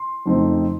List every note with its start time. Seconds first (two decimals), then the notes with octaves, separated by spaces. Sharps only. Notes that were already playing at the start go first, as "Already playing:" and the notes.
Already playing: C6
0.26 F2 C#3 A3 C4 D#4